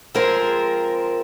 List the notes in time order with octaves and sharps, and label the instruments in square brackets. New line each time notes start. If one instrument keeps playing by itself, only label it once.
[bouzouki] F3 G#3 C4 [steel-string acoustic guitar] A#4